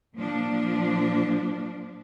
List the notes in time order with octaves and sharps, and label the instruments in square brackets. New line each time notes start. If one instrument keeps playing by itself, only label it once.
[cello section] A#2 F3 D4